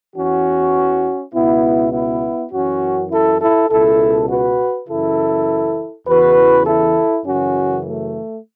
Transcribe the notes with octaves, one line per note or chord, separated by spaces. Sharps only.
E2 E3 C#4 F#4
C#2 B2 B3 E4
B3 E4
F#2 E3 C#4 F#4
E4 A4
E4 A4
C#2 B2 E4 A4
F#4 B4
F#2 C#3 E3 E4 A4
E2 C#3 E3 F#4 B4
E4 A4
F#2 C#3 E3 C#4 F#4
A3